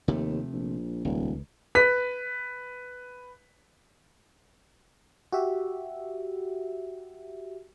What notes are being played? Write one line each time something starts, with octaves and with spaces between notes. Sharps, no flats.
D#2 C3 F3 A3
A#1
D#1 C#2
B4 B6
F#4 G4 E5